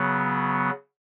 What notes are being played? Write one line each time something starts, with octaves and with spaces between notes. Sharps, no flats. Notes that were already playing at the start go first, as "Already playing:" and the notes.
Already playing: C#3 F#3 B3